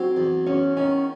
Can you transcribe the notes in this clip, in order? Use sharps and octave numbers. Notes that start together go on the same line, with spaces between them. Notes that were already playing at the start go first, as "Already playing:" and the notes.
Already playing: F#3 C4 C5
E2
E2 C#4 C#5
D#3 C#4 C#5